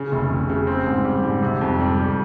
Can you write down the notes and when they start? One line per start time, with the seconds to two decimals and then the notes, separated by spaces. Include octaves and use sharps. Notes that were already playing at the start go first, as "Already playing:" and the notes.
Already playing: C#3
0.12 F1
0.30 F1
0.50 C#3
0.67 C4
0.87 G#2
1.04 G3
1.24 G#2
1.42 C3
1.61 F2
1.79 G3
1.98 F2